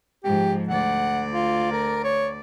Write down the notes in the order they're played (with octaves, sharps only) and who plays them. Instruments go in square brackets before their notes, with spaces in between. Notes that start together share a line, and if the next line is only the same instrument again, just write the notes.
[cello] G#2 F3 [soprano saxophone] G4
[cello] D2 D5 [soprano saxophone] F#5
[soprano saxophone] F4
A#4
C#5